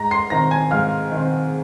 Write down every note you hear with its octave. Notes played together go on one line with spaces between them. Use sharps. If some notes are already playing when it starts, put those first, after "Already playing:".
Already playing: G#2 A#5 A#6
C6 C7
D#3 C4 A#5 A#6
G#5 G#6
G#2 F5 F6
D#3 C4